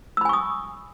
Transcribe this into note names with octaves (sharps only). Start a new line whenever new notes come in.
G#5 B5 C#6 D#6 E6